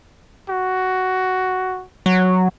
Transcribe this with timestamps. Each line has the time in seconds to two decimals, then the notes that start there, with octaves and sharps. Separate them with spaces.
0.49 F#4
2.06 F#3